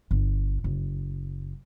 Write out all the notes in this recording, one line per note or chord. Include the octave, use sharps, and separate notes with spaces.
G1
F#1